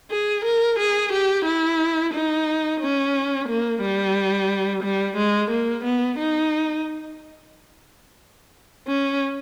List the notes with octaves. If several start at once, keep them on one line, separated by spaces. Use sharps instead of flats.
G#4
A#4
G#4
G4
E4
D#4
C#4
A#3
G3
G3
G#3
A#3
B3
D#4
C#4